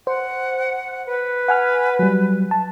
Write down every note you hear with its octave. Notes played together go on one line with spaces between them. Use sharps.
C5 F#5
B4
F#5 G#5 F6
F#3 G3
A5